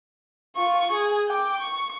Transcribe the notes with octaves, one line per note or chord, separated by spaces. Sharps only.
F4 C#6
G#4
G5 D6
C#6